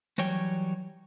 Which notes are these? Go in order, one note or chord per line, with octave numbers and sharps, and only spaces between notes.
E3 F#3 G3 C#5 G5